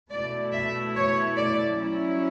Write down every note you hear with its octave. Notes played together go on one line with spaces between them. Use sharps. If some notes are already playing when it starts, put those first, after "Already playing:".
B2 A3 E4 D5
E5
C#5
D5
F#3 C#4 E4